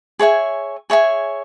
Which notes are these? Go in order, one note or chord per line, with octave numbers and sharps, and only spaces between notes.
G#4 C#5 E5 G#5
G#4 C#5 E5 G#5